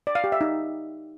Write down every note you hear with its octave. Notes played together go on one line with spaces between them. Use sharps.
D5
F5
G4
E5
D#4